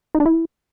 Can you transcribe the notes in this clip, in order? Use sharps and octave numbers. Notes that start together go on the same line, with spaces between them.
D#4
D4
E4